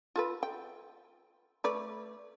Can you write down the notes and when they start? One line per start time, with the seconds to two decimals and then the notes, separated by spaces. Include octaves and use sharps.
0.16 F4 A4 B4
0.43 G5
1.64 A3 B4 D5